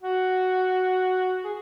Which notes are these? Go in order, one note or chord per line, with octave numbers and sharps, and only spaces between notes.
F#4
G#4